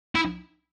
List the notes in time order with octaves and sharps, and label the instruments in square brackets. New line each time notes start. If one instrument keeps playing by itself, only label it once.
[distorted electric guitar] E4